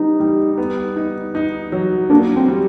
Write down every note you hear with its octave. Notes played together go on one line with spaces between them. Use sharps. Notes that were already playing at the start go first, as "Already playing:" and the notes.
Already playing: G3 B3 D#4
G3
B3
D#4
D#4
F#3
A#3 D4
C4
G3